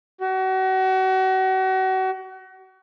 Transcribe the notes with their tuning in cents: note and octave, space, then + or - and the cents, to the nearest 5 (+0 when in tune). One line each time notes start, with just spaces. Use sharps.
F#4 +35